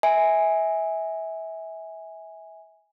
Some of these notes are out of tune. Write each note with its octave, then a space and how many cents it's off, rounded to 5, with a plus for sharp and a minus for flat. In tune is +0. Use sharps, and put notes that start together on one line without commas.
E5 -25 G#5 -5